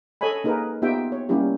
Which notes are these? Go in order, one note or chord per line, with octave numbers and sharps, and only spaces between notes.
A4 C#5 D#5 G#5 B5
A#3 D#4 G#4 A#4 B4
B3 D#4 F4 G4 E5 G5
C#5
G3 A#3 C#4 E4 G4